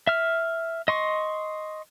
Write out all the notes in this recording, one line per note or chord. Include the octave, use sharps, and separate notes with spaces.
E5 F6
D#5 C6 C#6